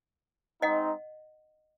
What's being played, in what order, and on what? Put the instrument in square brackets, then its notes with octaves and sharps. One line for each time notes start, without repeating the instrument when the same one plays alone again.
[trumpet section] G#3 C4 D#4 [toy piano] D#5 F#5